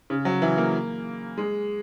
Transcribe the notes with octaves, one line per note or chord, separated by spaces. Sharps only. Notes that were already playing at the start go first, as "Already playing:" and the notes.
C#3
F#3
E3
A#3
G#3